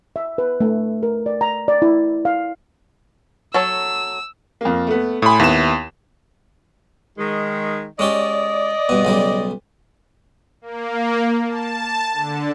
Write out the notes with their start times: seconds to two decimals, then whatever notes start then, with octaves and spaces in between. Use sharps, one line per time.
0.16 E5
0.38 B4
0.60 A3
1.03 A#4
1.26 D5
1.41 A#5
1.68 D5
1.82 E4
2.25 F5
3.54 F#3 A4 C#5 E6
4.61 F2 A#3
4.87 A3 B3
5.22 A2 G#5 B5 C6 D#6
5.40 D#2 B3 E4 E7
7.18 D#3 G#3
7.99 G#3 C#4 G4 D5 D#5
8.89 G2 B2
9.05 B1 C#3 G3
10.61 A#3
11.46 A5
12.13 D3